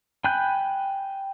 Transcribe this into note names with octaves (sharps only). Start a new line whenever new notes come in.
G5 G#5 B5 F#6 G6